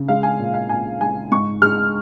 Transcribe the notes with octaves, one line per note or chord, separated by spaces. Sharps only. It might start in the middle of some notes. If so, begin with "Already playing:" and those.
Already playing: C#3
G#3 F5
G#5
A#2
F5
A#2 G#5
G#3 G#5
G#2 C#6
G#3 F6